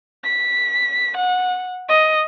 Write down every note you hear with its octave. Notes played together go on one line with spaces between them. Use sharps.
B6
F#5
D#5